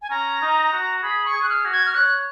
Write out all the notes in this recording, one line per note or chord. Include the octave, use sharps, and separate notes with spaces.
G#5
C#4 A#5
D#4
F#4
G#4 B5
C#6
G#4
F#6
F6
F#4
G#6
F6
C#5 F#6